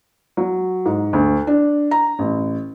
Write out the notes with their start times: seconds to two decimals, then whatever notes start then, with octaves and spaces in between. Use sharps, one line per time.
0.37 F#3
0.86 G#2
1.13 D2
1.47 D4
1.91 A#5
2.19 A1